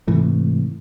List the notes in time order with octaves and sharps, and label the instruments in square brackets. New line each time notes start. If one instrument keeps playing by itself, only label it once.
[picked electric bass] G#2 C3 E3 A3